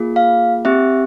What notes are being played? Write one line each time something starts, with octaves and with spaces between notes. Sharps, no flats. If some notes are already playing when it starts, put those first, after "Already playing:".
Already playing: A#3 F4 G#4
F5
C4 G4 E5